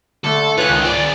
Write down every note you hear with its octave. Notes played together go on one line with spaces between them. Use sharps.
D3 A3 A4
F4 G#4 B4 C#5 F#6
C#2 D#3
C4 G#4 D5